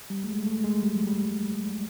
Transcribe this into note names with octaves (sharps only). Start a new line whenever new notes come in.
G3
A3
G#3
A3
G#3
G3
F#3
G3